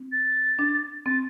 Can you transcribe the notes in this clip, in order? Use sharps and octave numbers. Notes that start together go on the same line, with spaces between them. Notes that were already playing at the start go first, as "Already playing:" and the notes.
Already playing: C4
A6
D4
C4 A6